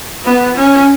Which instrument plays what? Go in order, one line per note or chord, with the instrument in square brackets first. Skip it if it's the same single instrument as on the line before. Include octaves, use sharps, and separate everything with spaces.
[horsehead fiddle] B3
C#4